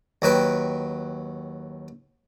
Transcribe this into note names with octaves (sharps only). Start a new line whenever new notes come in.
D#2 F#3 B4 G5